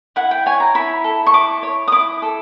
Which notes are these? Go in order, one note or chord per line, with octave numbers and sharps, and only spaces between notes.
E4 F#5
G5
C#5 G#5
A#5
E4 B5
A4
C#6
E4 D6
C#5
D#6
E4 D6
A4